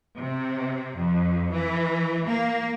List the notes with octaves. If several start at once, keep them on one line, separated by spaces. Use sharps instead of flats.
C3
F2
E3
A#3